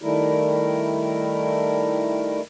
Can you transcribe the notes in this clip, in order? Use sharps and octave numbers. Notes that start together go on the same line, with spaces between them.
D#3 G3 A3 E4 A#4